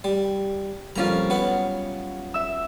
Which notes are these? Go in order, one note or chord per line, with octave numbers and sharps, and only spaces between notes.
G3
F2 G3 A#3 C#4 F4 A#5
F#3 B3 B4
E5 E6